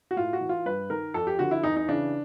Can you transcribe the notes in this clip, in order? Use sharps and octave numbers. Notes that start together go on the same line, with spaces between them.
F#4
A2 F4
F#4
E3
F4
G2 B4
D#3 A#4
F2 A4
G4
D3 F3 F#4
E4
E2 D#4
D#4
C#3 E3 D4